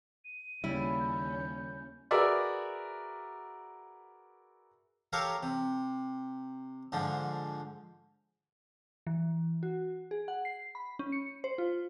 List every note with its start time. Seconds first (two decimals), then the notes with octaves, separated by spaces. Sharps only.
0.25 D#7
0.64 D#2 C#3 G3 C#4 E4
1.00 G6
2.11 F#4 G#4 A#4 B4 D5 E5
5.13 G4 A4 A#4 C#5 F5
5.43 C3
6.92 G#2 D3 F3
9.07 E3
9.63 F#4
10.11 G#4
10.28 F#5
10.45 C7
10.75 B5
10.99 C#4
11.12 C#7
11.44 C5
11.58 F4